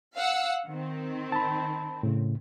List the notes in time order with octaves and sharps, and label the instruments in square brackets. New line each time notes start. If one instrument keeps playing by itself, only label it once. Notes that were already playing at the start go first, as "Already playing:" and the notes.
[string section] F5 F#5 E6
D#3 C4
[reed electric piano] A5 B5
A2 C#3